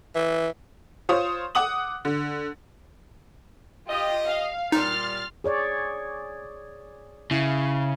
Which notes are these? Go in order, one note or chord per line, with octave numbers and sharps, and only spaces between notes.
E3
F4 C5 C#5 D#6
F#5 D6 D#6 F#7
D3
F4 G4 D#5
F5
A#2 G3 D#4 C6 F6 A6
G#4 C#5 D5
C#3 E4